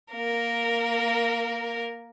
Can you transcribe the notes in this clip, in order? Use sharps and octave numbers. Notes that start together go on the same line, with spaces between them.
A#3 A#4